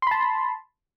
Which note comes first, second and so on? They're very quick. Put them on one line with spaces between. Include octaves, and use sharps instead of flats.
C6 B5 A5